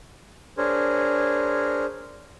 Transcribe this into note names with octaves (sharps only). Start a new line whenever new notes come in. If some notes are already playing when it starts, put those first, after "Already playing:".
D4 G#4 A#4 C5 C#5